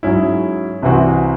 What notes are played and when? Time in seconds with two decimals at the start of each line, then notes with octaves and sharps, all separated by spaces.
0.03 G#2 F#3 C#4 E4
0.82 C2 C3 E3 C4 F#4